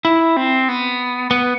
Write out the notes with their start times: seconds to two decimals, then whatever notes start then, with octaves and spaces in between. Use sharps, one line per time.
0.05 E4
0.37 C4
0.69 B3
1.31 B3